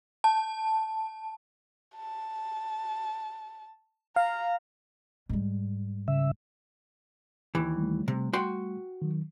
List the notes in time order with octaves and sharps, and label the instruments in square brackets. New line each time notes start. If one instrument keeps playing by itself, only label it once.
[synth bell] A5
[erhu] A5
[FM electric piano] F5 [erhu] A#5
[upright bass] G#2 G3
[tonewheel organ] C#3 E5
[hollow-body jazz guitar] D#2 E3
[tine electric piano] G3 A3
[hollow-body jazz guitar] C3
F#4 G5 C6
[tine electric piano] D#3 F#3